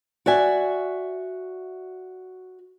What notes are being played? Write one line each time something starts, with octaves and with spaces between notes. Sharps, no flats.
F#4 D5 E5 G#5